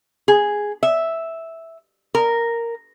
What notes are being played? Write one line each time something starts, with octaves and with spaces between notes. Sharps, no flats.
G#4
E5
A#4